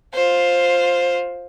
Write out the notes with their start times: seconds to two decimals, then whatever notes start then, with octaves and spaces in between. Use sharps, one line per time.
0.13 F4 C5